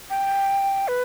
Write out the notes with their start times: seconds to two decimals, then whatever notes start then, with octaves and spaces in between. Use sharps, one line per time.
0.10 G5
0.88 B4